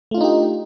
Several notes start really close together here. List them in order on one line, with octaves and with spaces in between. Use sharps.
A3 F4 D4 D#4 G4